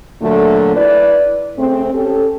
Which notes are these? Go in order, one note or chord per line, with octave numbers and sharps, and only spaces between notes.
A#2 D3 F#3 A3
E4 B4 D5
C#3 A3 C4
C#4 G4 A4